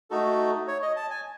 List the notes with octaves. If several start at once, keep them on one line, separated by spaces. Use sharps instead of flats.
A3 D#4 F#4 A4
C#5
D#5
A5
G#5